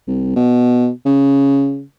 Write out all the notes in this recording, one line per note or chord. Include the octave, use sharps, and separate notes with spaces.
C2
B2
C#3